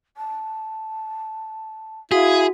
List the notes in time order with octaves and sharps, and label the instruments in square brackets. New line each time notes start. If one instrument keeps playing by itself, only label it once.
[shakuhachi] A5
[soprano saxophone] E4 [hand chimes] F#4 [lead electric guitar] G#4 [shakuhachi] F5